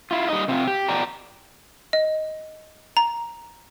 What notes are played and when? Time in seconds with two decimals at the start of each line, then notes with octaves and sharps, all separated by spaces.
0.11 E4 F4
0.29 G3 D#4 D#5
0.48 C3 C4 F4
0.67 G4
0.88 B2 F3 D5 G5 A#5
1.93 D#5
2.97 A#5